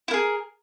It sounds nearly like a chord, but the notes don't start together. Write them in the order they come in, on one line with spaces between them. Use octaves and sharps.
E4 A#4 G#4